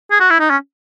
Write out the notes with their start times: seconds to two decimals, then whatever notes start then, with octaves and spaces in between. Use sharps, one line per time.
0.11 G#4
0.20 F#4
0.30 E4
0.40 D#4
0.50 C#4